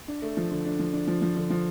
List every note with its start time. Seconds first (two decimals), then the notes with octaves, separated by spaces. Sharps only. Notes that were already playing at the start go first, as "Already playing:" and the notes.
0.08 D4
0.22 A3
0.37 F3
0.51 D3
0.66 D4
0.79 F3
0.93 D4
1.07 F3
1.22 F3
1.36 D3
1.50 F3